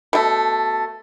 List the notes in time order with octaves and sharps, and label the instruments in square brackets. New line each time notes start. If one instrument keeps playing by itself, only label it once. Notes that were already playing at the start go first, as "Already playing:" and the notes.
[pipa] B2 A3